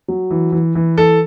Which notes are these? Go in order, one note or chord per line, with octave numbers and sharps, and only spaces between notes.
F#3
E3
E3
E3
E3 A4